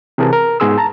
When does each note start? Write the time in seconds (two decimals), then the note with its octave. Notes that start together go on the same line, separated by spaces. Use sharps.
0.18 C3 E3 G#4 A#4 A5
0.33 A#4
0.60 G#2 B3 G#4 C6 E6
0.78 A5 A#5